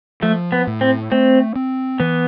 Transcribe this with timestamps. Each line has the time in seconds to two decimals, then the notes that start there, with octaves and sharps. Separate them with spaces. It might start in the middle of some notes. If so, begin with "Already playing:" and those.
0.22 F3 A3
0.52 B3
0.67 A2
0.81 C4
1.12 A3 C4
1.56 C4
2.00 E3 B3